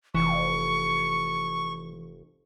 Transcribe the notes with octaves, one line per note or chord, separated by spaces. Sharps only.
F1 E3 C#6